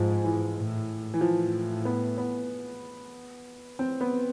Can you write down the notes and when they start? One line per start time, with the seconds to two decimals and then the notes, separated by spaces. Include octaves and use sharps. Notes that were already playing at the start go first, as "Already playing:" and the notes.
Already playing: G#2 F3 G#3
0.24 E3
0.56 A2
1.14 E3
1.21 A2 F3
1.85 B3
2.18 B3
3.79 C4
4.01 B3